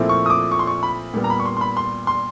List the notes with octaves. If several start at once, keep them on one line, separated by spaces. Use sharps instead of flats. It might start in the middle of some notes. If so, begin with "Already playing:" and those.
Already playing: A#2 F3 A3 C4 E4
C#6
D#6
D6
C#6
C6
C#6
B5
A#2 G3 B3
A#5
B5
C#6
C6
C6
B5
C6
C6